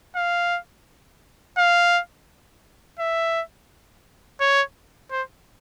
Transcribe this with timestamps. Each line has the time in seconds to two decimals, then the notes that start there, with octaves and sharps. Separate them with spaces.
0.16 F5
1.58 F5
2.99 E5
4.41 C#5
5.11 C5